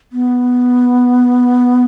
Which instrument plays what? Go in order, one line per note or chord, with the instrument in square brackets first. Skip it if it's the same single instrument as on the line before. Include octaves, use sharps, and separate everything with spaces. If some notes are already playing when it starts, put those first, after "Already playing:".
[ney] B3